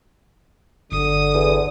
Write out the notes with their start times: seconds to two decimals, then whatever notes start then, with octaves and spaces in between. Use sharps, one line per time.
0.92 G1 D3 D#6
1.34 E2